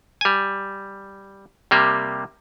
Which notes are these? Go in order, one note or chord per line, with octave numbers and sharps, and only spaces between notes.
G3 G#5
C3 G3 A#3